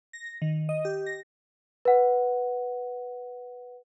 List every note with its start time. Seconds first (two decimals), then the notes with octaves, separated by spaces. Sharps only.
0.13 A#6
0.42 D#3
0.69 D#5
0.85 G4
1.06 A#6
1.85 B4 F#5